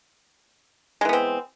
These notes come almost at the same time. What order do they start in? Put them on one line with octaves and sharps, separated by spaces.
G#3 E3 B3 C4